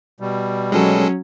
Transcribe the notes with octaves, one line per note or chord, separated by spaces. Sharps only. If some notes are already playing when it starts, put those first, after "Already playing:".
B2 G3
F#3 G#3 C#4 G#4 A4